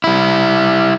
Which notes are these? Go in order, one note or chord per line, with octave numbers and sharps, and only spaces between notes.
G3 E4